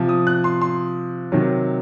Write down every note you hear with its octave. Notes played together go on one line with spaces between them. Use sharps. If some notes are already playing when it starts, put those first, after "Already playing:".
Already playing: C3 F3
D#6
F#6
C6
C6
C3 D#3 F#3